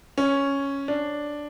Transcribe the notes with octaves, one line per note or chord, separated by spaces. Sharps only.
C#4
D4